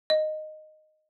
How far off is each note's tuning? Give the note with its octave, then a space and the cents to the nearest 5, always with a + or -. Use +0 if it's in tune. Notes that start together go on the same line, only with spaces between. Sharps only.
D#5 -10